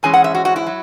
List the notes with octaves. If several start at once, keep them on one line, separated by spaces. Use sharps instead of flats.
G#2 E3 G#3 C#4 G#5
F#5
E5
F#4
F#4
E4
F#3